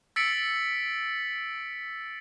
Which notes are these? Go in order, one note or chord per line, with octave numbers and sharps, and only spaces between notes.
E6 A6 B6 C#7 D7 F#7